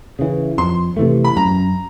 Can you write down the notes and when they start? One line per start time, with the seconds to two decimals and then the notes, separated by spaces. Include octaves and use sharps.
0.19 C#3 E3
0.58 F2 C6
0.97 C3 E3 A3
1.24 B5
1.36 F#2 A#5